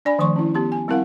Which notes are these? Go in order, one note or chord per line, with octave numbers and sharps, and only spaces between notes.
D4 D5 G#5 B5
D#3 F3 A3 C6 C#6
C#4 E4
B3 G4 C6
G#5
G3 C4 E4 A#4 F5 F#5